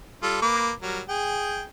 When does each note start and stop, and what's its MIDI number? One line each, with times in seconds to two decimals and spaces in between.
0.23 0.41 55
0.23 0.41 65
0.23 0.41 69
0.42 0.71 58
0.42 0.71 71
0.42 0.71 86
0.82 1.01 54
0.82 1.01 55
0.82 1.01 70
1.09 1.64 68
1.09 1.64 79